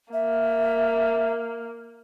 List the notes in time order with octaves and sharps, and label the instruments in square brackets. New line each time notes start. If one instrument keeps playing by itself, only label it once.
[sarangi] A#3 [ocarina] E5